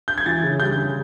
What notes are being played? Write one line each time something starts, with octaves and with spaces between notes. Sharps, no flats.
G6
G#6
E3 A6
C#3
G3 G6
C#3